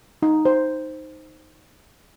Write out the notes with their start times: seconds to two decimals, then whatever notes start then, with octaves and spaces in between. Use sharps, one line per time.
0.22 D#4
0.45 C5